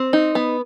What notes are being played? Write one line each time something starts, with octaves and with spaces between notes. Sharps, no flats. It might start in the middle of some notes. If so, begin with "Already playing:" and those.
Already playing: C4 C5
D#4
B3